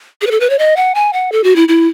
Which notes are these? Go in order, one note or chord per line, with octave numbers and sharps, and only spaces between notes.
G#4
B4
A4
B4
C#5
D#5
F#5
G#5
F#5
A4
F#4
E4
E4